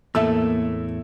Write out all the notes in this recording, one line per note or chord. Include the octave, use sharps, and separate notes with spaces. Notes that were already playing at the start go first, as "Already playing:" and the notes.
E2 A2 A3 A#3 A4 E5 E6